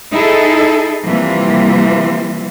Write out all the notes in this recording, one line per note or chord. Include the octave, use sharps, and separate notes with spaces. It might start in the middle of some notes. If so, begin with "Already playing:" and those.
D#4 E4 G#4 A4
C3 E3 F3 G3 A#3